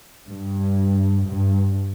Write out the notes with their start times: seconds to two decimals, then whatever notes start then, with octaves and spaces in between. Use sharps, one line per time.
0.30 G2
1.28 G2